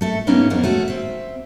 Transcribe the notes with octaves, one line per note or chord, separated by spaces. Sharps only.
A3 A4 E5
G#2 F#3 A#3 B3 C#4 D#4
F2 A#3 B3 A#4
A3 C#4 F#4
C4 E5